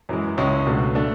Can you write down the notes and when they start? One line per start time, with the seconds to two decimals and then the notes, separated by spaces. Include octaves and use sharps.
0.09 F#2 E3 G#3
0.37 C#2 C#3 G#3 C#4 E4
0.67 C#2 B2 A3 D4
0.95 D3 A3 D4